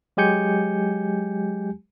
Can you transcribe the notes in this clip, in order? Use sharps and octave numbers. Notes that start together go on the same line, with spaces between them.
F#3 G#3 G4 G#5 G6 C#7